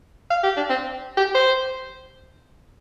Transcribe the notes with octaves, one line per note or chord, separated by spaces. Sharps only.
F5
G4
D4
C4
G4
C5